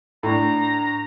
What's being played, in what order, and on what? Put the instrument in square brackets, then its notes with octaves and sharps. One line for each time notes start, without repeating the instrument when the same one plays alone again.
[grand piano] A2 D4 [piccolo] A#5